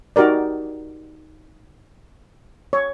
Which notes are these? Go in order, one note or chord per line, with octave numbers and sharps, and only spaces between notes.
D#4 F#4 G4 A#4 D5
C#5